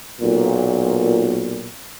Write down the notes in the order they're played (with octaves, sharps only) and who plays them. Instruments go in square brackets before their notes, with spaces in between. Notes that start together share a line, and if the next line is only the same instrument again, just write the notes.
[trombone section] B1 A#2